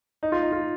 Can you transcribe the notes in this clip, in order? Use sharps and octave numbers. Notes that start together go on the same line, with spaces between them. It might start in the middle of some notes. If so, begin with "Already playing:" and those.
D#4
F4
D#4
F4